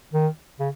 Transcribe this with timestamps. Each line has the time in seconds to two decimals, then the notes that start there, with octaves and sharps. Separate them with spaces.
0.14 D#3
0.60 C#3